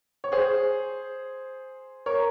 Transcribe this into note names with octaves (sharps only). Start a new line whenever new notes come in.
C#5
G#4 C5
A#4 C#5